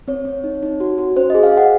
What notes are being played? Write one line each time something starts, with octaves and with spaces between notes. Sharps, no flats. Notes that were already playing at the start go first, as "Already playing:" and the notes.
C4 C#5
C4
D#4
D#4
F#4
F#4
C#4 C5
G#4 D#5
F5
G#4
F#5